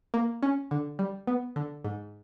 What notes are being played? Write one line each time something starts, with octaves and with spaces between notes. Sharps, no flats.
A#3
C#4
D3
G3
B3
D3
G#2